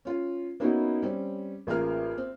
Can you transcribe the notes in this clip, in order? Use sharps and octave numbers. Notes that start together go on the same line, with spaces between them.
C#4 F4
A#3 B3 C#4 D#4 E4 F#4
G3 C4 C#4
A1 A#3 F4 G#4 A#4 F6
C4